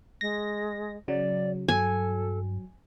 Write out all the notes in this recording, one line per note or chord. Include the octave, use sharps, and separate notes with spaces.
G#3 A#6
C#3 F#3 D5
G2 F#3 A4 G#5